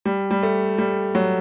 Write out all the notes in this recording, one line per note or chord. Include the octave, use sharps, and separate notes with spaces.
G3
G3
A3
G3
F#3